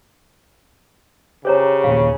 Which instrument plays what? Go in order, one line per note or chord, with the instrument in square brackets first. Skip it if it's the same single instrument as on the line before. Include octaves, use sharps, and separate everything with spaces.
[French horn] C#3 [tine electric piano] G4 [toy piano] C5 C#5 A#5
[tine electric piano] A#1 D#2 [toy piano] F5